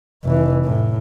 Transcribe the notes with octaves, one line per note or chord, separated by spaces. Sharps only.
F1 E3
A2